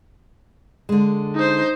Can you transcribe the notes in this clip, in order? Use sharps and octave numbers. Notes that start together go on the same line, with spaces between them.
D3 G#3
D#4 C5